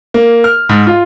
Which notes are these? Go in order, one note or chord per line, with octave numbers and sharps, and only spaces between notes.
A#3
F6
G#2
F4